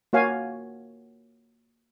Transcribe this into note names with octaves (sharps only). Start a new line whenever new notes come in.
A#3 F#4 C#5 F5 G#5